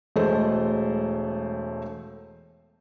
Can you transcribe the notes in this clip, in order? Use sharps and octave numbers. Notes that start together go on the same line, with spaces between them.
E1 G#3 A3 C5